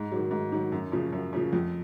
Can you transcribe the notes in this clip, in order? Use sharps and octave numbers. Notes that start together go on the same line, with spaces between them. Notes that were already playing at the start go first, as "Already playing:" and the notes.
Already playing: G#2
D#3 F#3
G#2
D#3 F#3
F#2
C#3 F3
F#2
C#3 F3
F2